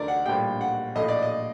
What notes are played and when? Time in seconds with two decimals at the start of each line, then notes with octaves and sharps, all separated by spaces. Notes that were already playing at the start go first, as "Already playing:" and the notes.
Already playing: D2 D3 A#4 D5
0.08 F#5
0.26 A#1 A2 G3 G5
0.61 F#5
0.95 A#1 A2 A3 D#5
1.08 D5
1.23 D#5